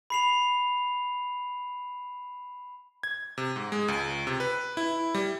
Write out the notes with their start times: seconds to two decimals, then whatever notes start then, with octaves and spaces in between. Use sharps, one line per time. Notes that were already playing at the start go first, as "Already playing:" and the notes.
0.10 B5 C7 F7
3.03 G#6
3.38 C3
3.56 G#2
3.72 G#3
3.88 C#2
4.27 C3
4.40 B4
4.77 E4
5.15 G3